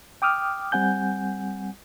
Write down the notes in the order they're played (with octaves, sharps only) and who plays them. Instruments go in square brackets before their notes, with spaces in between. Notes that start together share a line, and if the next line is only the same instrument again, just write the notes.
[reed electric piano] G5 D6 D#6 F6
G3 C4 F#5 G#5 G6